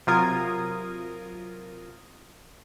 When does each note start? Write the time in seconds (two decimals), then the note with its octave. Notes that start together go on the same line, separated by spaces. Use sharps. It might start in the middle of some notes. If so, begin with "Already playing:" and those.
0.07 C3 F#3 F4 A#4 D#6 G#6